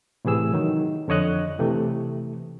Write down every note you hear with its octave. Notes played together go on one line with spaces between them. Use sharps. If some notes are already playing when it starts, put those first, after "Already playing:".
A2 C3 E3 G#4 E6
D#3 F#3
F2 D3 C#5 D#5 F#6
C3 E3 A3